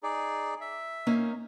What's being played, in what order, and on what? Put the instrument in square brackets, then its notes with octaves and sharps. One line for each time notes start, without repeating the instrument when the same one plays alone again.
[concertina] D#4 G#4 D5
E5
[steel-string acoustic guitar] A#3 C#4 D#4